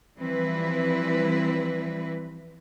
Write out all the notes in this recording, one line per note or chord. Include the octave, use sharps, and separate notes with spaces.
E3 F3 G3 C4 E4 B4